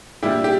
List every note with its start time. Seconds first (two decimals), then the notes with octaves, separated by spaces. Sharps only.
0.23 A#2 G3 D4 E4 G4
0.44 G4